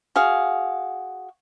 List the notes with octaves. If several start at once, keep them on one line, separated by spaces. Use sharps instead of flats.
F#4 G#4 F5